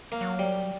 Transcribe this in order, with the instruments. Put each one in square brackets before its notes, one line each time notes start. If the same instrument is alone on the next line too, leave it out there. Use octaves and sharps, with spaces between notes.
[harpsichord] A#3
[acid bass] F#3
[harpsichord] G3